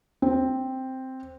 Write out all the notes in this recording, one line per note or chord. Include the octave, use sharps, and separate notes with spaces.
C4